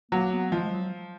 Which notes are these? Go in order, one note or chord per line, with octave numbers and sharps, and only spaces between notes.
F#3 A#3
B3
F3 G#3
G#3
F#3